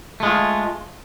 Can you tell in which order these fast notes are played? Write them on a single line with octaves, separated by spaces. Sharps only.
A3 G#3 F4